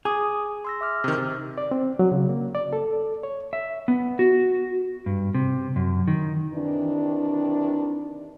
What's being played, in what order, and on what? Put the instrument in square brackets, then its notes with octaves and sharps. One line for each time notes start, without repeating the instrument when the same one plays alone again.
[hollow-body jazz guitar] G#4 [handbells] D6 D#6
[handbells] C6 E6 A#6
E5 D6 F6
[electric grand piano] C3 D#3
C3
[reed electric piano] D5
C4
F#3
C#3
A#3
D5
A4
C#5
[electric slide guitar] E5
B3
F#4
G2
C3
F#2
D#3
[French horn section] C3 D#3 E3 D4